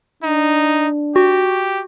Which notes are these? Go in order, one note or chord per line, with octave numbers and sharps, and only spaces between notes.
D4 D#4
F#4 G4